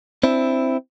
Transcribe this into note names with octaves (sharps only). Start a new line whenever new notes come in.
C4 D4 E4